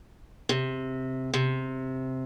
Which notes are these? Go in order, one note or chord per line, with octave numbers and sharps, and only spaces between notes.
C3
C3